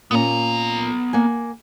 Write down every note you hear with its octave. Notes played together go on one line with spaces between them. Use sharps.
A#2 A#3 B3 C#4 A#5
A#3 F#5 G#5